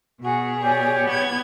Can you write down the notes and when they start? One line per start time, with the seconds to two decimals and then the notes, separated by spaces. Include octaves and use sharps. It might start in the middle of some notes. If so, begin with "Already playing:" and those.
0.22 B2 F#4 G#4
0.61 G4 C#5 D5
1.06 B3 G#6